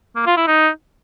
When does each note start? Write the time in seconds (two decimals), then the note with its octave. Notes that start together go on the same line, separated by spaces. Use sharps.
0.16 A#3
0.26 F4
0.37 E4
0.47 D#4